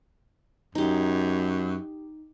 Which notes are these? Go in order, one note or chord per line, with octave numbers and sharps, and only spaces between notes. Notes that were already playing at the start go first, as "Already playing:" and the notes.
F#2 D#4 G4